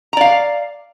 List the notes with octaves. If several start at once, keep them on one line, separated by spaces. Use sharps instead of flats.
D5 F5 A#5